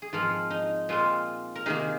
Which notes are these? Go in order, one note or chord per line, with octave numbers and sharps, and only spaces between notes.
G#4
G#2 F3 C4 F4 A#4
D#4
A#2 G#3 C4 F4
A#4
C3 D#3 A#3 D#4 G#4